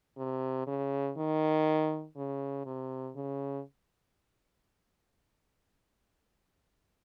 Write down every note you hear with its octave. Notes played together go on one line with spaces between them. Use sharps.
C3
C#3
D#3
C#3
C3
C#3